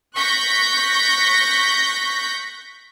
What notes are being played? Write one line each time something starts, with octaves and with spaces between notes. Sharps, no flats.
C#6 F#6 G6 A#6 B6